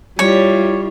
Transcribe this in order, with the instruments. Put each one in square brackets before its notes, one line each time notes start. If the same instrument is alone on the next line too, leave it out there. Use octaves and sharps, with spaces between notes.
[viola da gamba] G3 [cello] E4 F4 [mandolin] C#5